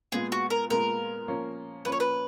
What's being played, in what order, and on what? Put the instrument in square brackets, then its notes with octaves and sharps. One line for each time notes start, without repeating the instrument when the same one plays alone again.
[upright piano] A#2 G#3 B3 F4 [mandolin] G#4
[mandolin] F#4
A#4
[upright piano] A#2 G#3 B3 F4 [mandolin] A#4
[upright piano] F3 A#3 C#4
[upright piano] F3 A#3 C#4 [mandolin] B4
[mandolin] C#5
B4